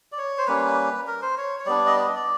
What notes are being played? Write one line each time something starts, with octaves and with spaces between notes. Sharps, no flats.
D5
C#5
C5
G3 A#3 C#4 B4
A#4
C5
C#5
C#5
G3 B3 D4 D5
D#5
D5
D#5
D5